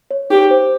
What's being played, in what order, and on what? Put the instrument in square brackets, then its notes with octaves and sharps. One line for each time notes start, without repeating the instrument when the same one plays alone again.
[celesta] C#5
[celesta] D#4 [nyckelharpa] G4
[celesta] C5